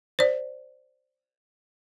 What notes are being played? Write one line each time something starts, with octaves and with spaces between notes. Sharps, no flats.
C5 D5